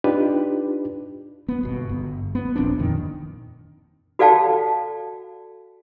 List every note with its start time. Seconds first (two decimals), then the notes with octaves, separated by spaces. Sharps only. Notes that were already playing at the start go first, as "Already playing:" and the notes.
0.04 D4 D#4 F4 G4 B4
1.48 B3
1.63 G1 B2
1.89 G1
2.35 B3
2.56 D#1 A#1 C4 D4
2.79 F2 A#2 D#3
4.19 F#4 A4 D5 F5 G5 A5